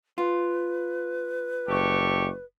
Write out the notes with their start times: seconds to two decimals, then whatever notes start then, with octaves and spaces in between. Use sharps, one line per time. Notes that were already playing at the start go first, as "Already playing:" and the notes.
0.18 F4 B4
1.68 F#1 G4 A4 C#6